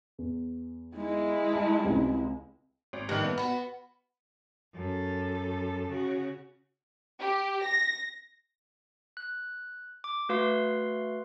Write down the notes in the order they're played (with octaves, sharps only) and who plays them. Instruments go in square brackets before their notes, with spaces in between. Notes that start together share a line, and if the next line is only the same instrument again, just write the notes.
[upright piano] E2
[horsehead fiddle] G#3 E4
[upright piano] A5
C#2 C3
[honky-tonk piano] G#1
[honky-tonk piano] G2 D#3 [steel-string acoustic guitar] E3
[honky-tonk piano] B3
[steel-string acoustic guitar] B3 F#4 [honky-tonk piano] B5
[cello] F#2 A4
C#3 F#4
[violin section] G4
A#6
[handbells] F#6
D6
A3 F#4 B4 F5 C6